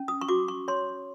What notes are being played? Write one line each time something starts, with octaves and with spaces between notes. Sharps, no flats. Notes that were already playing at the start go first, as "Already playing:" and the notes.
Already playing: C#4
D#6
C#6
F#4 D6
C#6
C#5 C6